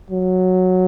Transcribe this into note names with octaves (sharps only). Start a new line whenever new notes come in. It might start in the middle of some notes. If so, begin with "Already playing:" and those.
F#3